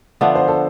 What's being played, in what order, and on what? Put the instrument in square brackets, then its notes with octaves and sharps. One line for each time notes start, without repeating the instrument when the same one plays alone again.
[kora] D3 F3 B3 D4 [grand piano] E5
[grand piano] C5
A4